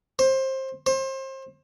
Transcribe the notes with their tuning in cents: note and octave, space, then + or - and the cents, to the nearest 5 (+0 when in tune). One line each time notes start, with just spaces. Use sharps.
C5 +20
C5 +30